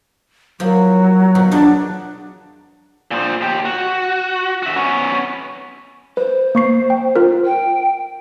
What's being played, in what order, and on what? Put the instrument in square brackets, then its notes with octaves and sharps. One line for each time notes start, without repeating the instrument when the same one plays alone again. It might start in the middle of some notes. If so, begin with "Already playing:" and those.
[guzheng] F3 A#3 E4 [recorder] F#3
[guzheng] B2 F3 F#4
[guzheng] E2 F#3 D#4 [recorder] D4
[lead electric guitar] A#2 C5
D#2 G4
F#4
F#4 E5
B3 C#4
[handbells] B4 [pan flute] C5
[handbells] A#3 C#6 C7
G5
F4 A#4
[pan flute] G5